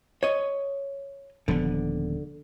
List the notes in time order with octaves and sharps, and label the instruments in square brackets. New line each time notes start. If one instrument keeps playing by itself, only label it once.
[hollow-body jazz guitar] C#5 D#5
[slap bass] D#1 F3 B3 [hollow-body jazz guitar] D3